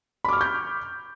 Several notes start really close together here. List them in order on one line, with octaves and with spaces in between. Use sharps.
B5 D6 F6 C#6 G6